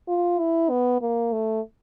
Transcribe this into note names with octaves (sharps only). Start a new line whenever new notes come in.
F4
E4
B3
A#3
A3